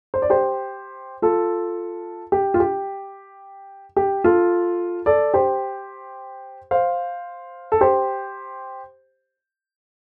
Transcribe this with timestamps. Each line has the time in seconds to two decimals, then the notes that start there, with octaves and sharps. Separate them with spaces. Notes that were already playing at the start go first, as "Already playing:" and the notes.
0.14 C5
0.22 D5
0.30 G4 C5
1.22 F4 A4
2.32 G4
2.54 F4
2.60 G4
3.96 G4
4.24 F4 A4
5.06 A4 D5
5.34 G4 C5
6.71 C5 F5
7.72 A4
7.81 G4 C5